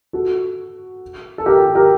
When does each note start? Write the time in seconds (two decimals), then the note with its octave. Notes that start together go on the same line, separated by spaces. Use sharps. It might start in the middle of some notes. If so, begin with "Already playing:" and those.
0.13 F#4 A4
1.38 A4
1.46 G4 A#4
1.75 G4 A#4